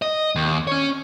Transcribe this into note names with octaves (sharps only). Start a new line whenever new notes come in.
D#5
D#2
C#4 C#5